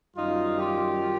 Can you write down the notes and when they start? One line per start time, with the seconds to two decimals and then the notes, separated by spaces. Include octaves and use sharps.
0.16 F#2 D#3 G3 D#4 F4
0.59 F4 G4